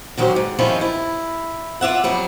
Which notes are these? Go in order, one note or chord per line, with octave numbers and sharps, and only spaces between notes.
D3 D#3 F#3 G4 C5
G#2
D#3 F3 G3 C#4 E4 F4
E4
F4 D5 E5 F#5
F2 F#3 G3 C5